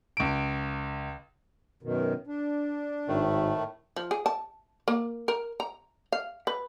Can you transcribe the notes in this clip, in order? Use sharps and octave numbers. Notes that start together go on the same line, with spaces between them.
C#2 D7
F#2 B2 D#3
D4
G#1 A2 D#3 A3
F3
G#4
A5
A#3
A#4
A#5
F5
B4